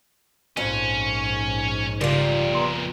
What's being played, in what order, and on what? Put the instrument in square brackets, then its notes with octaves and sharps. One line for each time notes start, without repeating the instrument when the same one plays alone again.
[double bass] A#1 G#2 [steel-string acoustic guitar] F2 [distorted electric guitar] C#4
[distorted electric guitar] F2 A#2 [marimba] C#3 [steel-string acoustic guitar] G3 F4
[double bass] B3 [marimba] A#5 C6